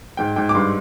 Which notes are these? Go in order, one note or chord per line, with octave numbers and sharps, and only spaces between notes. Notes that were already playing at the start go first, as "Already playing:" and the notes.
G#2 G5
G#2 G5
D6
G2 C6